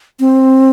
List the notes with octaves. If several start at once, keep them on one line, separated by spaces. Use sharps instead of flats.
C4